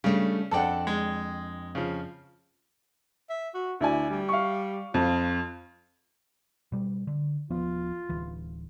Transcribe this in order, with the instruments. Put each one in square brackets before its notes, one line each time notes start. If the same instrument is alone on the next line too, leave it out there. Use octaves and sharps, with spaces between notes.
[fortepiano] C#3 [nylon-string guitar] G3 A3 D4
[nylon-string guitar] F2 D4 G5 [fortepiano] A4 D5 F#5
[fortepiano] G#3
C#3 F3
[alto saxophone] E5
F#4
[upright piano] D2 D5 G#5 [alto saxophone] E4
[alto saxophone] G3
[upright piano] F5 C#6
[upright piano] F2 [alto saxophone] F4
[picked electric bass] B2 G3
D3
[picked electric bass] D#1 F3 B3 [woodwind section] F4
[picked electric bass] D1 E3